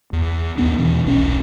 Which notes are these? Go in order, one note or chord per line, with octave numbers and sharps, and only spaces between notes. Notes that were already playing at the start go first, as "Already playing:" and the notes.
E2
D#2 A2 B3 D4
D#2 B2 E3
D#1 B1 C4 C#4